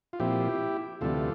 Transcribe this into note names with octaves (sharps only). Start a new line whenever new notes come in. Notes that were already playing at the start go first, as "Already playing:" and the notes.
F4
A#2 F3 C4 E4 G4
D2 C3 E3 G3 F4 A4